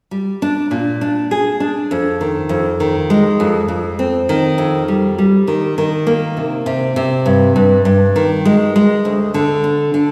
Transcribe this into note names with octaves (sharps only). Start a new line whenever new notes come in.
G3
D4
A#2
D4
G#4
D4
F2
D#3
F2
D#3
G#3
F2
F2
C4
D#3
F2
G3
G3
D#3
D#3
A#3
C3
C3
C3
G2
G2
G2
D#3
G#3
G#3
D2
D3
D4
D3